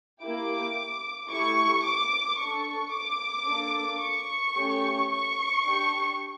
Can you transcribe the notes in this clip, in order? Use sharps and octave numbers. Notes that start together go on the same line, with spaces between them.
A#3 E4 G4 D6
A3 E4 G4 C#6
D6
D4 A4 C#6
D6
A#3 D4 A4
C#6
A3 C#4 G4
C#6
D4 G4